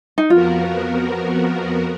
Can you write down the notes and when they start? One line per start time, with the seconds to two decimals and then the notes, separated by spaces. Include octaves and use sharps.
0.18 D#4
0.30 F2 F3 B3 F4 F#4 A#4